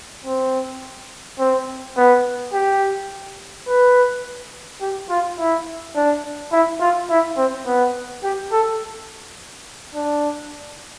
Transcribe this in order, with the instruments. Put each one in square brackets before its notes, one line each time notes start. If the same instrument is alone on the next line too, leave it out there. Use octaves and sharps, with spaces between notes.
[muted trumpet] C4
C4
B3
G4
B4
G4
F4
E4
D4
E4
F4
E4
C4
B3
G4
A4
D4